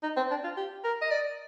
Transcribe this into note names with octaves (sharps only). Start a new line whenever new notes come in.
D#4
C4
D4
F4
G4
A#4
D#5
D5